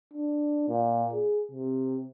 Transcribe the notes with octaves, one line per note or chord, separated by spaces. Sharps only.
D4
A#2
G#4
C3